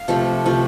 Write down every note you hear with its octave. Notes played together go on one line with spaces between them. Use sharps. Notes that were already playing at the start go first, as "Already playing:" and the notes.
Already playing: F5
C3 F3 A3 A4
C3 F3 A3 F4